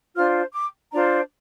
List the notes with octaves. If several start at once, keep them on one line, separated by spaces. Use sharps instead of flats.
D4 F4 C5 F6
D6
D4 F4 C5 A#5